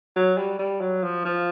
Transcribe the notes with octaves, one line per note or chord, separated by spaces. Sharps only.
F#3
G3
G3
F#3
F3
F3